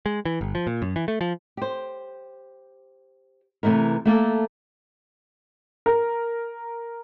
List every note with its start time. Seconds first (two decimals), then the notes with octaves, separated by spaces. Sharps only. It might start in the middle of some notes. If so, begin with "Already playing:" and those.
0.06 G#3
0.25 E3
0.41 G1
0.55 F3
0.67 A#2
0.82 F#2
0.96 E3
1.08 A3
1.21 F3
1.57 G4 C5
3.63 C3 E3 A3 E4 A#4
4.05 A3 A#3 A4
5.86 A#4